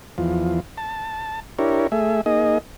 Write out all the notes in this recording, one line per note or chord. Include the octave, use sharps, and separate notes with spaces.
E2 F3
A5
D4 E4 G4 A#4 C#5
A3 G#4 E5
A#3 D#4 G#4 D#5